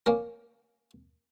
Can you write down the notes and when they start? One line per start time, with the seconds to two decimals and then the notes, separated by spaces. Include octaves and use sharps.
0.06 A#3 C#4 A#4